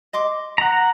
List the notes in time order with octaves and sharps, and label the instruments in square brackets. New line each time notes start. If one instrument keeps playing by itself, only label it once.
[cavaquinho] D#5 C6 D6
[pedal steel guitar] F#5 A#5